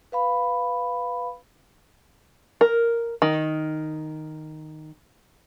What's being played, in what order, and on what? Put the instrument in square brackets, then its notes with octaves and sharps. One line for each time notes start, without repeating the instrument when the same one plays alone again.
[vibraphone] B4 F5 B5
[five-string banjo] A#4
D#3